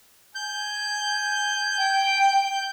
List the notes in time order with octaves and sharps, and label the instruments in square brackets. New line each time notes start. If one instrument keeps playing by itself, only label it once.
[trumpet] G#5 [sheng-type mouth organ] G6
[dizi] G5